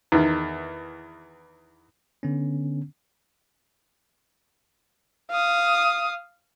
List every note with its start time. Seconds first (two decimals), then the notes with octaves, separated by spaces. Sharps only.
0.12 E2 D#3
2.23 D3 B3 C#4
5.31 F5 D#6